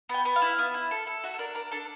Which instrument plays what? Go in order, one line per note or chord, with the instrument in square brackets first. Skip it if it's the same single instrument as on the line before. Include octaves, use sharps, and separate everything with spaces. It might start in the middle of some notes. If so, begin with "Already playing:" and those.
[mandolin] B3 G5
B3
F5
E4
B3
E4
A4
A4
F#4 E5
A4
D4 A#4
D4 A#4
D4 A4